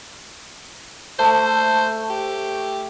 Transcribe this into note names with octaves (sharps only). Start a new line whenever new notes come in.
A3 C5
G4